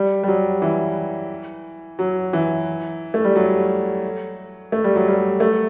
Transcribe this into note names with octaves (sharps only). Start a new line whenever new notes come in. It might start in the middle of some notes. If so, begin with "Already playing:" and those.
Already playing: G3
G3
F#3
E3
F#3
E3
A3
G3
F#3
A3
G3
F#3
G3
A3